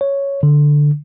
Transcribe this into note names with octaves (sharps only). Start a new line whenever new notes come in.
C#5
D3